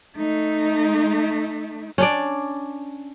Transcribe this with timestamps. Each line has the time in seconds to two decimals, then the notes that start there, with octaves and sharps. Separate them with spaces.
0.17 A3 D#4
1.98 C#4 D4 D5